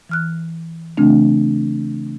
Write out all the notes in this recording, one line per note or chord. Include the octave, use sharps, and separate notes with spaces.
E3 F6 F#6
C#3 E3 A3 C4 D4